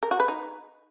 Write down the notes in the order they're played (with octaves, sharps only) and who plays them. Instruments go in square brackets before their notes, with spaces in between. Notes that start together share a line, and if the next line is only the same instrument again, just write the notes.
[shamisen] A#4
F#4
B4
D#4